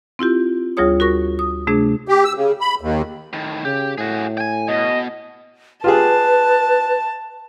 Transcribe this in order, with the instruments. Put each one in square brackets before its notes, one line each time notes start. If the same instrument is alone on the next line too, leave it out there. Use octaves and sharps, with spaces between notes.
[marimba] C4 E4 F4 G4
D2 G3 F4 G#4 C#5 D#6
F#4 A#4 C#6 A#6
D#6
C3 A3 D4 G#4
[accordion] G4
E6
C#3
B5
D#2
[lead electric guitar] A2 D#3
[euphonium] C#3 [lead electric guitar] G4
[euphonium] A2 [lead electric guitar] F#4 G#4
[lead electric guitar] G5 G#5
[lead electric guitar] B2 [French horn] D#5
[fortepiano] F4 G4 G#4 [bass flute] B4 [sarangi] A5